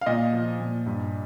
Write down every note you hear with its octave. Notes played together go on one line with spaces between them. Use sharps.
F5
A#2 D#5
F3
A#2
G2